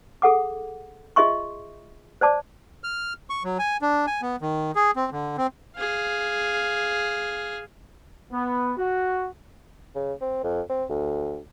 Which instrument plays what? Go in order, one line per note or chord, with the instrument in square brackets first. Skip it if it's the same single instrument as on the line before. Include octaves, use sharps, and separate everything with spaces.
[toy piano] G#4 A4 F#5 D6
F4 G#4 D#5 E5 C6 C#6
C5 D5 A5 D6
[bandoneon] F6
C#6
F#3
G#5
D4
G#5
B3
D#3
G#4
C4
D3
C4
[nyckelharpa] G#4 F5
[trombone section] B3
F#4
[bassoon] C#3
C4
F2
C4
D2